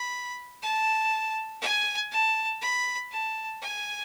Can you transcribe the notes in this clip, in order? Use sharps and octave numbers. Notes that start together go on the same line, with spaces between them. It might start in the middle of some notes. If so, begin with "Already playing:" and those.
Already playing: B5
A5
G#5
A5
B5
A5
G#5